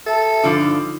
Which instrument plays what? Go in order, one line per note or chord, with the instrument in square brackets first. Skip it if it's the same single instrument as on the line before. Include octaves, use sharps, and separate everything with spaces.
[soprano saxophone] A4 [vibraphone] E5 A5
[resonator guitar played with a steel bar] G2 D3 F3 [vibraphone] D#4 F4